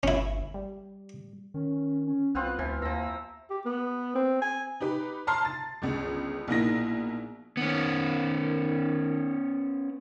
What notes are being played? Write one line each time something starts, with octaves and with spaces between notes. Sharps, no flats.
G1 C#4 E4
G3
D#3 C#4
C#4
C2 B3 C4 F4 F#6
D2 E3 F3 B4
D#2 F3 A#5 E6
G4
B3
C4
G#5
D#4 G4 B4
A5 A#5 C6 F6 C7
A6
G1 C#2
A#1 B2 A#3 D#4 E4 A#6
D#3 B3 C#4